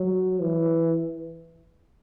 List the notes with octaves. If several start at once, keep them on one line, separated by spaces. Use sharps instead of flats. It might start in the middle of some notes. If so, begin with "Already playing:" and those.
Already playing: F#3
E3